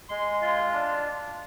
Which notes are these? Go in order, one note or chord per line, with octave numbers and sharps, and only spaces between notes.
G#3 C6
F4
D4